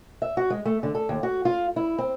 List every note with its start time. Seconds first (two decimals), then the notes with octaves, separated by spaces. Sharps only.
0.22 E5
0.37 F#4
0.50 G#3
0.65 A3
0.83 D3
0.95 A4
1.09 D#2
1.23 F#4
1.45 F4
1.76 E4
1.98 C4